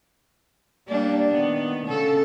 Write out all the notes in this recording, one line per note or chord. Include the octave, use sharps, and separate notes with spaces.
G3 A#3 D4
D#3 B3
C#3 A4